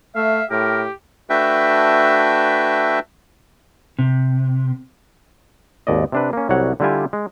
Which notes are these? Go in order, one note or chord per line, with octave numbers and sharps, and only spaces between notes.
A3 E5 F5
A2 G4 A#4
A3 D4 F#4 B4 E5 G5
C3
G#1 D#2 D5 D#5
C3 D4 B4
A#3 C#4
C2 F#3 G3 C#5 F#5
D3 G3 E4 F4 G4 G#5
G#3